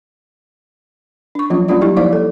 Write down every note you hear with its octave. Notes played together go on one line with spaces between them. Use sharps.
D4 C#6
F3 F#3 A#3 C#4 F4
G3 A#3 C#4 D4 F4 D5
F#3 E4 G4
F3 A#3 D#4 C5 D5 F5
A4